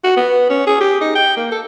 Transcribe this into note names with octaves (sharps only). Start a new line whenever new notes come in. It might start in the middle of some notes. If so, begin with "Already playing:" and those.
F#4
B3
C#4
G#4
G4
D#4
G5
A#3
A4